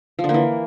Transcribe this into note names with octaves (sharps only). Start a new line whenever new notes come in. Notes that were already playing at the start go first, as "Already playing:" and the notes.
F3
D3
A#3
E3